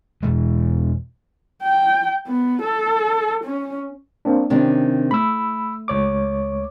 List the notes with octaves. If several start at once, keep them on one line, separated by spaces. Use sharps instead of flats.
E2 B2 G#3
G5
B3
A4
C#4
A#3 C4 D4
C3 D#3 C#4 D4
A3 B5 E6
C#2 C#5 D6